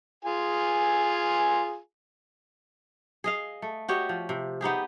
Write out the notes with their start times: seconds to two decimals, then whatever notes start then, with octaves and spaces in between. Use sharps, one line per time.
0.25 F4 G#4 G#5
3.24 G#4 D#5 F5
3.62 A3
3.89 F#4 G4 C#5 D#5
4.09 F3
4.29 C3
4.61 B3 D#4 G4 G#4